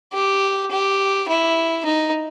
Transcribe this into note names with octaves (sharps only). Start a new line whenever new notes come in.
G4
G4
E4
D#4